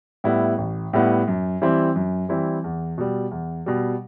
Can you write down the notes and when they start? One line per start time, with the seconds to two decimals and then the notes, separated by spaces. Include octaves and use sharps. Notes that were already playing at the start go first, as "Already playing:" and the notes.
0.24 A2 G3 B3 E4
0.58 A1
0.93 A2 G3 B3 E4
1.28 F#2
1.62 E3 G3 C4 E4
1.95 F#2
2.29 E3 G3 C4 E4
2.64 E2
2.98 B2 G3
3.31 E2
3.66 B2 G3